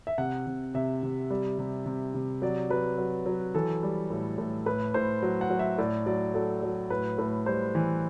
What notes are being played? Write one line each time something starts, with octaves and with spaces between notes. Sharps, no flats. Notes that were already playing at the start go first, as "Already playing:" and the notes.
E5
C3 F#5
C3
C3 E5
C3
G3
C3
C3
C3
F#3 D5
F#3 B4
F#3
F#3
E3 A4
G3
A2
A2
A2 B4
A2 C5
F#3
F#5
F#3
E5
A2 D5
F#3 D5
F#3 A4
F#3
A2 B4
A2
G3 C5
E3